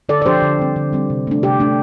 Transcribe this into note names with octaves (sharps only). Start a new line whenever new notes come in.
D3 A4 D5
D5
F3 D4 G4 C5
D3
G3 C4
D3
G3 C4
C3
A3 D4
C3 G4
A3 D4